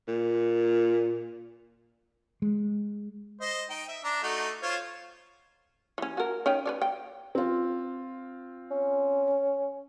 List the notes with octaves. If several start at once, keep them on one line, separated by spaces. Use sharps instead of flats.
A#2
G#3
C5 D#5
D#4 G5
E5
D4 A#5
A3 D#4 F#4
F4 C5 C#5
E3 C#4
F#4 A#4
C#4 D#4 G5
B4 C#5 D5
G5
C4 F4
C#4